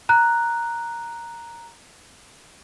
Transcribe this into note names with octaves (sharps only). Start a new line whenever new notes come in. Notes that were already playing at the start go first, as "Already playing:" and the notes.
A#5 F#6